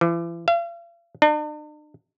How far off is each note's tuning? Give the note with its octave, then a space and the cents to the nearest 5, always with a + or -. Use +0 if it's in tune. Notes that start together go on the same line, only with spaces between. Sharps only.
E3 +40
F5 -40
D4 +45